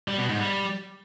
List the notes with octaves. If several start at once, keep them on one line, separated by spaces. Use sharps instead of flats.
G3
B2
G#2
G3